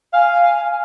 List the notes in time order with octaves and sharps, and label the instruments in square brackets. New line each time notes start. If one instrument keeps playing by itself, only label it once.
[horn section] F5 [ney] G#5